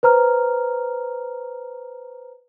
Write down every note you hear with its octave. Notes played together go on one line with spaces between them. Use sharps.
B4 C5 A#5 F6